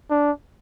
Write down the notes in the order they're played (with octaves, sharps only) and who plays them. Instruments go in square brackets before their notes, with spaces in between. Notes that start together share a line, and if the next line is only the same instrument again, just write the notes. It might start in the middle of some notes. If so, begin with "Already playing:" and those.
[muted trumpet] D4